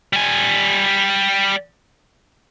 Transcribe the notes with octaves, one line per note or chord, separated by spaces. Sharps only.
G3 G#5